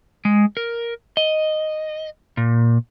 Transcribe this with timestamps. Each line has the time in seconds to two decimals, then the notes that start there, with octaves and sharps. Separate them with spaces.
0.25 G#3
0.57 A#4
1.17 D#5
2.37 A#2